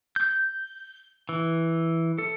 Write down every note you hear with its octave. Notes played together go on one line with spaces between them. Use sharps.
G6
E3
A4